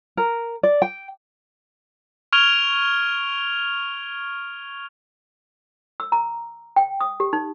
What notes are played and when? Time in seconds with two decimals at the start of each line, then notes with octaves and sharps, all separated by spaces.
0.17 A#4
0.63 D5
0.82 G5
2.33 C#6 F6 G#6 D7 F7 G7
6.00 E6
6.12 A#5
6.76 G5
7.01 D#6
7.20 G4
7.33 D#4